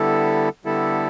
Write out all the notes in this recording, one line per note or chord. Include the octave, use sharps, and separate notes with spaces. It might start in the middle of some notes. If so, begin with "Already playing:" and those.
Already playing: D3 G3 B3 E4 A4
D3 G3 B3 E4 A4